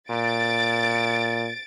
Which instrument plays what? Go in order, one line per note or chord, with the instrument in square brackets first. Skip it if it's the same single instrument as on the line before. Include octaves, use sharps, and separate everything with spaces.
[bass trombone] A#2 [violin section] A6 D7